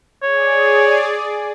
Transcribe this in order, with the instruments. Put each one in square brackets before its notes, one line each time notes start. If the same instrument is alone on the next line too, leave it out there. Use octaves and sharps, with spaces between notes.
[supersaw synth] G#4 D5 [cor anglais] C#5